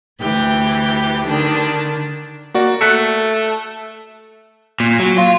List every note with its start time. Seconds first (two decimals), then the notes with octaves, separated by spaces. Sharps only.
0.21 D2 E3 G4 G5
1.27 D3 D#3 D4
2.54 A#3 F#4 D5
2.81 A3 F#6 B6 C#7
4.80 A#2
4.99 F#3
5.18 F4